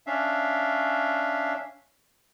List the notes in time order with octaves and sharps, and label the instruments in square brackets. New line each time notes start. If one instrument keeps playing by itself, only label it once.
[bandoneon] C#4 D4 E5 F5